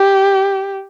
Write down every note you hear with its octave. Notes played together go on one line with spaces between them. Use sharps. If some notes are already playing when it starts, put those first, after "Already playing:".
Already playing: G4